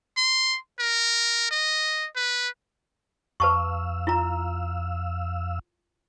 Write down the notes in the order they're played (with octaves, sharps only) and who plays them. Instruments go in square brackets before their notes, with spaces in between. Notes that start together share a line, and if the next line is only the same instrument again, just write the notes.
[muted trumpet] C6
A#4
D#5
B4
[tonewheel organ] F2 F5 E6 [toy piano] B4 A5 C#6
[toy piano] E4 F4 A#5